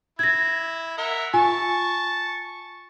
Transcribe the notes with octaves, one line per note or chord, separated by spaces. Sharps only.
E4 G#6 A#6
A#4 E5 F#5
F4 G#5 A5 C#6